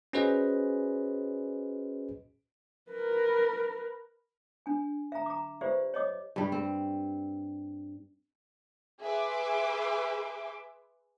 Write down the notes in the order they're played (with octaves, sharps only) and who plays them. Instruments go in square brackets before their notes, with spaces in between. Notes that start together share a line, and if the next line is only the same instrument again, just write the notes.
[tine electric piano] C#4 F#4 G#4 B4 C5 D#5
[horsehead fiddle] A#4 B4
[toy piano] D4 G#5
E5 A#5
A#5 D6
F4 G4 B4 C5 D5 E5
C#5 D#5 D6
[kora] G2 G3
C4
[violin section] G#4 B4 E5 C6 D6